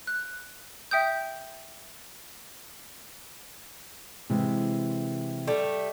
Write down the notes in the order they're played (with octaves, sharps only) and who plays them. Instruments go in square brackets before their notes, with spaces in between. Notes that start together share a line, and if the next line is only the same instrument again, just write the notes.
[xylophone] F#6
E5 G5 D#6 G6
[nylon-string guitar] C3 E3 G#3
[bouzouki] G3 A3